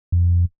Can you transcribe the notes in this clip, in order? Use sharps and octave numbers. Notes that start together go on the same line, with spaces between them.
F2